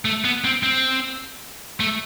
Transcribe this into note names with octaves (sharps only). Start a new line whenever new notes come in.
A3
B3
C4
C4
A3